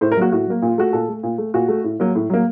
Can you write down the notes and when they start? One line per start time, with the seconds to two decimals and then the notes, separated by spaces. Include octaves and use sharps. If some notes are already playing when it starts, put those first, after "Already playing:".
0.01 A2 C5
0.12 A#4
0.17 F#3 A#3 F#4
0.32 A2 F#4
0.47 F#3 A#3
0.62 A#2
0.67 F4
0.78 A3 F#4
0.93 A#2 A4
1.08 A3
1.23 A#2
1.38 A3
1.54 A#2 F#4
1.68 A3
1.84 A2
2.00 F#3 A#3
2.15 A2
2.30 F#3 A#3